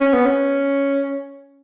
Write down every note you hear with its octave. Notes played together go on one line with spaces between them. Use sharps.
C#4
B3
C#4